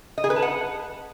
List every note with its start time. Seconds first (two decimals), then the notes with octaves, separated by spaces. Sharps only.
0.18 D#5
0.24 G#4
0.30 B4
0.36 A5
0.42 F#5